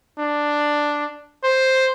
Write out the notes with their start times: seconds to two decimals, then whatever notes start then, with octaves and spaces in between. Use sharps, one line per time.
0.19 D4
1.43 C5